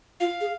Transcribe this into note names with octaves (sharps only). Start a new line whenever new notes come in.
F4 F5
G#4